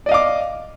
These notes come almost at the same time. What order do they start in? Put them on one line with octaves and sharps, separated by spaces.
D5 D#5 F5 D6